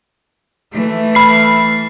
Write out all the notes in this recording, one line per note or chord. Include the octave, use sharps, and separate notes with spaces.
E3 A3
B5 C7